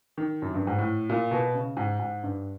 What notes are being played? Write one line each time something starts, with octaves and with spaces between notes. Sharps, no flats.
D#3
F#2
G2
G#2
A2
A#2
B2
C#3
G#2
G#2
G2